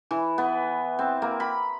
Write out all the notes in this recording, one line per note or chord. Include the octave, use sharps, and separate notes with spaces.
E3
B3
C4
A#3
B5